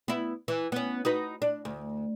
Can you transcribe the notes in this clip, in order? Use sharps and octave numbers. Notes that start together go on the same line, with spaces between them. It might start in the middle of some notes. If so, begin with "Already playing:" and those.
B3 E4
E3
B3 C#4
D#4 F#4 B4
D4
D2